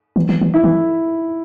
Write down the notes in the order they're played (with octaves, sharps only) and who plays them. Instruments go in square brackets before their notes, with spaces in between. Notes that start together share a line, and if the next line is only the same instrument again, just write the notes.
[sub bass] E3
E3
E3
[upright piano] E4
[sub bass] E3